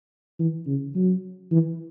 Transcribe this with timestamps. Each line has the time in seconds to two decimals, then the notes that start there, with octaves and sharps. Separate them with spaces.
0.39 E3
0.67 C#3
0.96 F#3
1.51 E3